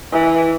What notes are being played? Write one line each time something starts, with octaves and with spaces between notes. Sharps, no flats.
E3